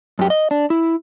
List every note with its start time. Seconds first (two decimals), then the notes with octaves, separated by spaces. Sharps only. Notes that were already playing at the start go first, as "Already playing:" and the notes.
0.19 F#2 G4
0.30 D#5
0.51 D4
0.70 E4